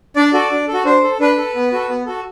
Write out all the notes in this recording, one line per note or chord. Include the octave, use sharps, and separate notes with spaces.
D4 D5
F#4 A4
D4
A4
F#4
D4 C5
A4
D4 B4
A4
B3
F#4 A4
B3
F#4 A4